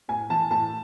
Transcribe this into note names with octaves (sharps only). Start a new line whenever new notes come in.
A2 G#5
E3 A5
A2 A5